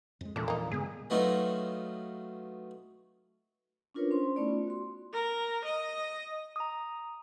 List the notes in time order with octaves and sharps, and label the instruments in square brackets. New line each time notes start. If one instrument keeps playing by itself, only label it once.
[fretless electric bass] F2 G#3
[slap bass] A#1 E2 [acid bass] A#2 [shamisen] A3 D4
[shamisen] A#3 D#4
[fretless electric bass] G2 B3 [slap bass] C#3 G#3 A3 [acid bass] G#4
[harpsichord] F#3 A3 B3 C#4 D#4 F4
[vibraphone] C#4 D4 F4 A#4 B4 C#5
C#4 C5 C6
A3 B3 C#4 D#4 E4 D5
F4
F#4 C6
[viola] A#4
D#5
[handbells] A#5 D#6